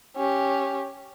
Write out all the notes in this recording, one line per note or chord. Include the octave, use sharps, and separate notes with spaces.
C#4 G4